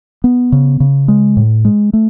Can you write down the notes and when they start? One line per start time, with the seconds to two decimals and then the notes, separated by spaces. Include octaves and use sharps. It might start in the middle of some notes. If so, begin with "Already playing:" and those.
0.24 B3
0.52 C#3
0.80 C#3
1.08 G#3
1.37 A2
1.65 G#3
1.93 A3